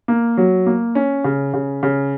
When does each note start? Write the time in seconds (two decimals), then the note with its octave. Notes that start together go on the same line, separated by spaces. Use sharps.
0.08 A#3
0.37 F#3
0.66 A#3
0.95 C#4
1.24 C#3
1.54 C#3
1.83 C#3